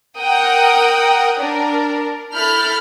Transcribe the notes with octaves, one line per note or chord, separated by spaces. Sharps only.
A#4 F#5 G5 D#6
D4 A#4
E4 A4 B5 F6 G6